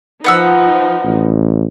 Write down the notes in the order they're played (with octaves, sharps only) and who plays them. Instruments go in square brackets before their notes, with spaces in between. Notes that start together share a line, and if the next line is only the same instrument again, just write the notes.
[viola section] F3 D#4 [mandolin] B3 F#5 E6
[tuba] A1